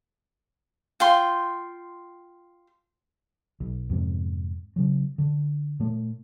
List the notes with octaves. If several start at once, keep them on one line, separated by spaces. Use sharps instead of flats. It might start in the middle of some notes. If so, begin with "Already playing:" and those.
F4 G5 C6
B1
F2 G#2 C3
C#3 F#3
D3
A#2 A3